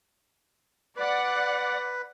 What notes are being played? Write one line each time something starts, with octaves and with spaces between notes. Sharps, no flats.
B4 D5 F#5